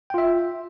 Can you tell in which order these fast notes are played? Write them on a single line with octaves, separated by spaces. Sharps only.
G5 F4 E5